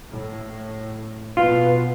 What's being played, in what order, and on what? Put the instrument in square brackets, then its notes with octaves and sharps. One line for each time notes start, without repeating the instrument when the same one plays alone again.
[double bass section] A2
[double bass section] B2 B3 [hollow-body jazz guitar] F4